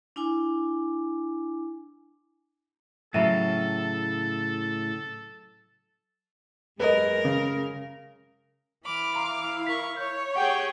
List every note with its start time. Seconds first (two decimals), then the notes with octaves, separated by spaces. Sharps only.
0.16 D4 E4 G#5 D6
3.14 A2 C#3 F#3 A4 E5 D#7
6.80 F#2 G#3 A#4 B4 D#5
7.25 C#3
8.85 E3 B5 D6 F6
9.16 E4 F5 A#5 C6
9.67 A#4 C#6 B6
9.97 C#5 G6
10.36 G4 G#4 F#5 G5